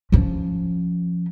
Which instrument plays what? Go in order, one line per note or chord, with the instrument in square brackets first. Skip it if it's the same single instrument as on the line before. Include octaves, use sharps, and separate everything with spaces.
[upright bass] F3 C#4